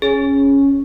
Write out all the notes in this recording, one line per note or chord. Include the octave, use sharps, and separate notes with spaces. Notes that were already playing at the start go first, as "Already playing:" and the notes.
C#4 G#4